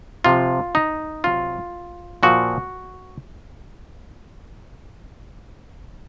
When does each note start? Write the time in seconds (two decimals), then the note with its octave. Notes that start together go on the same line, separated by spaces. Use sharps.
0.24 C3 F3 F4
0.75 D#4
1.24 C3 F#3 F4
2.23 A#2 F3 F#4